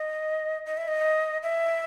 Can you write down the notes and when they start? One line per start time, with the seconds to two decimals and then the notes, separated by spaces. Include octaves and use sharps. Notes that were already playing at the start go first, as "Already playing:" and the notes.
Already playing: D#5
0.66 D#5
0.77 E5
0.88 D#5
1.43 E5